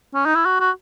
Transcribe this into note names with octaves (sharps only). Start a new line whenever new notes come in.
C#4
D#4
E4
F#4
F#4